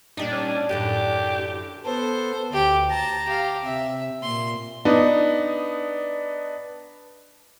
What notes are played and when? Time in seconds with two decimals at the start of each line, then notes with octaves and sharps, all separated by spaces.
0.17 A#2 G3 D4 D#4
0.31 C#4
0.69 F#2 A2 D3 G4
1.85 B3 A4 C5
2.53 D2 G4
2.90 A5 A#5
3.26 G4 F5
3.64 C3 E5
4.23 A#2 C6
4.85 B3 D4 D#4